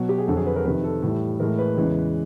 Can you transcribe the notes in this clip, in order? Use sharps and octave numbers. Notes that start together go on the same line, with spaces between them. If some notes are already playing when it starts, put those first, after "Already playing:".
Already playing: B2 F#3
G4
G#4
F2 D3 F#3 A4
G#4
B4
A#4
F2 C3 D#3 B4
A4
A2 E3 G3
A2 E3 G#3 A#4
B4
E2 C#3 E3 G#3